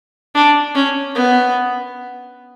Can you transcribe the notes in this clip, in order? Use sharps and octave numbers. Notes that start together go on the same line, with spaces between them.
D4
C#4
B3